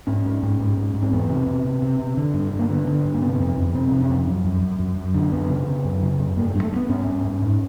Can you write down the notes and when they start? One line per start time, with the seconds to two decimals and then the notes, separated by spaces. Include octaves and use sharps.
0.07 G#2 C#4
0.25 G#2
0.43 G#2
0.60 G#2
0.77 G#2
0.94 G#2
1.03 C4
1.12 E2 B3
1.30 C3
1.47 C3
1.65 C3
1.82 C3
1.99 C3
2.17 D3
2.34 G2
2.52 D3
2.59 A#3
2.69 D3 B3
2.87 D3
3.04 G2
3.14 A#3
3.22 C3 B3
3.39 F2
3.57 F2
3.74 C3 C4
3.87 C3 C4
4.01 C#4
4.09 F2
4.27 F#2
4.45 F#2
4.62 F#2
4.79 F#2
4.97 F#2
5.14 D3
5.32 F#2 B3
5.49 C#3
5.67 C#3
5.85 F#2
6.02 C#3
6.19 F#2
6.37 G2 A#3
6.50 A3
6.55 G2
6.63 A3
6.72 G2
6.76 B3
6.89 G2 C#4
7.07 G2
7.24 G2
7.42 G#2